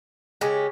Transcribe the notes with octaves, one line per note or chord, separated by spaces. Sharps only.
C#3 G#3 C#4 G4